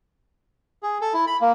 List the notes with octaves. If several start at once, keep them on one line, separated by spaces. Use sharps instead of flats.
G#4
A4
E4
B5
A#3